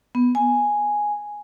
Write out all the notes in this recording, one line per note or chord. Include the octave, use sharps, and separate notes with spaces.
B3
G#5